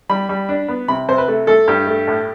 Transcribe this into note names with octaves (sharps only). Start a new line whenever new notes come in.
G3 B5
G3
D4
B3
C3 B5
C3 C5
B4
A3
A3 A4
G2 G4
A3
A2